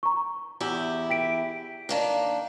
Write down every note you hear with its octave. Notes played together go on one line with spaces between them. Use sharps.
A#5 C#6
E2 E4 G4
G5 B6 D7
D#3 A#3 D4